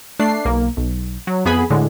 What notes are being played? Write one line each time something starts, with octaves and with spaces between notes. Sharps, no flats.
A3 D4 C7
B1 A#3
B1
F#3
F2 B3 G#4 G#5 B5
A2 D3 G#3